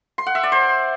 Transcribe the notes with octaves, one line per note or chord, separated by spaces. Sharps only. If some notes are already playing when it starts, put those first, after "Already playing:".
C6
F#5
E5
D5
C5